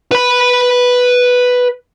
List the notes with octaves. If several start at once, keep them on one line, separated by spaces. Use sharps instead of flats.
B4 B5